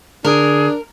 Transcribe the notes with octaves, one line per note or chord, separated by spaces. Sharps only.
D3 D4 G#4 A#4